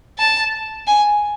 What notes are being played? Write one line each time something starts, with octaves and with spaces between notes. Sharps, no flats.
A5
G#5